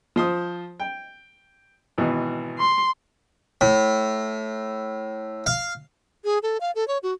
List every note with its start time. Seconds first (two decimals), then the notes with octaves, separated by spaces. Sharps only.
0.16 F3 C5 D#6
0.80 G5
1.98 G#1 B2 E3
2.59 C6
3.61 A2
5.46 F5
6.24 G#4
6.43 A4
6.61 F5
6.75 A4
6.88 C#5
7.03 F#4